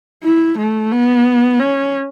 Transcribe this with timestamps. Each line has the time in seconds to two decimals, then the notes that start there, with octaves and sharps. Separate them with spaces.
0.23 E4
0.58 A3
0.92 B3
1.60 C#4